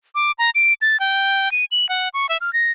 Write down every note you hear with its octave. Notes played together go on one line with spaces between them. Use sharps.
D6
A#5
D7
A6
G5
D#7
F#7
F#5
C#6
E5
F6
A#6